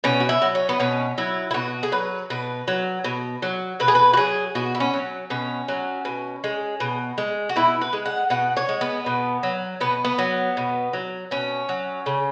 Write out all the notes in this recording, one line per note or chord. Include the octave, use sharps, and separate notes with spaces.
B2 C#4
F#4
E4
F#3
C#4
B3
B2 C#4
F#3 E4
E4
B2 F#4
G#4
F#3 B4
B2 B4
F#3
B2
F#3
B2 B4
G#4
B4
F#4
F#3 G#4
B2 F#4
E4
C#4
F#3
B2 C#4
F#3
B2
G#3
B2
G#3
F#4
B2 E4
B4
G#3
F#5
B2 F#5
C#5
G#3
B3
B2
F#3
B2 B3
B3
F#3
B2
F#3
B2 C#4
F#3
C#3